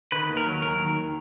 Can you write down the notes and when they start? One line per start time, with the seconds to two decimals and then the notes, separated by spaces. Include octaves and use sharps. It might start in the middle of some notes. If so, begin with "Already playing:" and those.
0.12 D#3 B4
0.29 D#2
0.37 A#4
0.46 F#3
0.62 D#2 A#4
0.79 D#3